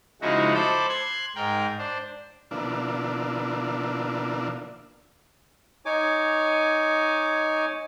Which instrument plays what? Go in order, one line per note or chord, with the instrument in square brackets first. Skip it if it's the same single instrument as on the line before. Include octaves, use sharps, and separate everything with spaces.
[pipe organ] C#3 F3 G#3 D#4 E4 F#4
A4 C5 B5 D6
C6 F#6 G#6
G#2 A#4 G5
D4 C5
[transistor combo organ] B2 D3 F3 A#3 D4 E4
[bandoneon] D#4 C#5 G#5 D6